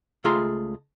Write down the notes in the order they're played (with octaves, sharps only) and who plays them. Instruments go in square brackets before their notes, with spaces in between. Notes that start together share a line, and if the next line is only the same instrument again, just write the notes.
[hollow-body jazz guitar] C#2 A3 F4 G#4 A#5 C6